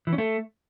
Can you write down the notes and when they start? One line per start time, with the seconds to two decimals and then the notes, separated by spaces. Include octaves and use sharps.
0.07 E3
0.13 C#4
0.18 A3